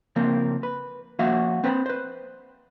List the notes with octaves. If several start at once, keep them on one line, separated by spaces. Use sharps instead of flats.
C#3 F3 A#3 C4
B4
F3 A#3 C#4 F#4 E5 F5
C4 B4 C5 A#5 B5
B4 C5